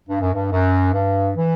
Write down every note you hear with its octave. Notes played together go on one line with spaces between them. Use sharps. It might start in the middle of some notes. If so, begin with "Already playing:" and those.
G2
F#2
G2
F#2
G2
E3